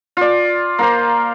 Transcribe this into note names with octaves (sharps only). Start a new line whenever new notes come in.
F4 D5
A#3 A#4 C5